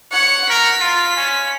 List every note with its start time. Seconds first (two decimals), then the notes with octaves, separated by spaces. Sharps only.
0.12 C#5 F#5 C#7
0.50 A#4 B6
0.80 F4
1.16 C#4